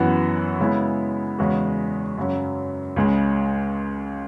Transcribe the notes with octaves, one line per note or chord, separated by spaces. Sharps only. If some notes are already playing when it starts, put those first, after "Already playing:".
Already playing: F#2 E3 B3 F#4
C#3 G#3 B3 E4
E2 C#3 G#3 C#4 F#4
F#2 C#3 F#3 C#4
C#2 C#3 G#3